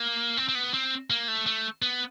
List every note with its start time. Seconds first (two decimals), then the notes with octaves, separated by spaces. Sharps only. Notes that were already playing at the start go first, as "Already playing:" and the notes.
Already playing: A#3
0.37 C4
0.49 C4
0.55 B3
0.74 C4
1.10 A#3
1.28 A3
1.46 A3
1.82 B3